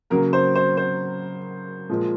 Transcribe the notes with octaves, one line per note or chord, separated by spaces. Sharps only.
C#3 F#3 A#3 A#4
C5
C5
C5
A#2 F3 G#3